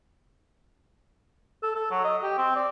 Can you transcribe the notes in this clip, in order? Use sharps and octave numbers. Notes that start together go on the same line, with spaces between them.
A4
A4
F#3
D#5
G4
C4
D5